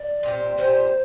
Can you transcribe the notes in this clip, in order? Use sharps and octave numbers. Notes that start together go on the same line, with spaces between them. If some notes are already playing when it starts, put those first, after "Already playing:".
Already playing: D5
A#2 G3 C4
A#2 G3 C4 C5